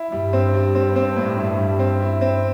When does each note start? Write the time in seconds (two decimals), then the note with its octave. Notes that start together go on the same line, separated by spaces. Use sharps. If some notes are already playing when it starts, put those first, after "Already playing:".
Already playing: E4
0.12 G2 G3
0.33 C4
0.54 G3
0.75 C4
0.96 C4
1.16 A2
1.38 E4
1.58 G3
1.79 C4
2.00 E4
2.21 C4